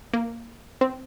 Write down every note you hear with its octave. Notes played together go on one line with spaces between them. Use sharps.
A#3
C4